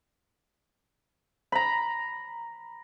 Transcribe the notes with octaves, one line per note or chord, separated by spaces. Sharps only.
A#5 B5